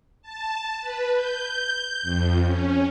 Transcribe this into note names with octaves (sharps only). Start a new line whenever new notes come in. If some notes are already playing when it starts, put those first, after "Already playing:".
A5
B4
G6
F2
C#4